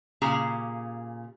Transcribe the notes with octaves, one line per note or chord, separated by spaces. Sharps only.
A#2 C#3 G4 G#4 A#5